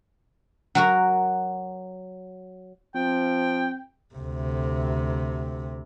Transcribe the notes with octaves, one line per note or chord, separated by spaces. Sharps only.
F#3 F#4 A#4
F3 C4 G5
D2 C3